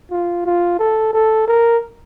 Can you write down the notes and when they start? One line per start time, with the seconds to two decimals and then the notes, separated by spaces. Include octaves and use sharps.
0.11 F4
0.46 F4
0.79 A4
1.13 A4
1.48 A#4